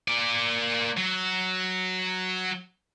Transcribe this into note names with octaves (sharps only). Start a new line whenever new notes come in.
A#3 D5
F#3